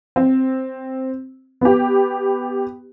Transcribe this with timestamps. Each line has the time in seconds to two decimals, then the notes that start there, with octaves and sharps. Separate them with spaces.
0.16 C4
1.61 B3 G4